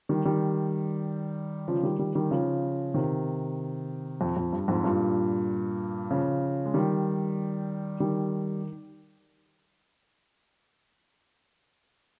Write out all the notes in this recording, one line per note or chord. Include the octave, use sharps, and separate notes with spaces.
D#3 G3
D#3 G3
C#3 F3
D#3 G3
D#3 G3
D#3 G3
C#3 F3
C3 D#3
F2
F2
G2
F2 G#2
G2 A#2
C#3 F3
G#3
D#3 G3
D#3 G3